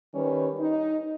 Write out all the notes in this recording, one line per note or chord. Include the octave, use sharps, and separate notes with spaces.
D#3 G3 C#4 B4
D#4